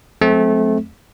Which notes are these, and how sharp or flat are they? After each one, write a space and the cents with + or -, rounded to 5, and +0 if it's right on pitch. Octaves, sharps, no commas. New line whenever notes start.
F#3 -30 A3 -25 C4 +0